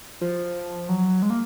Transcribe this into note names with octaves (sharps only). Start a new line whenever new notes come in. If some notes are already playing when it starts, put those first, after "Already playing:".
F3
F#3
G#3
A#3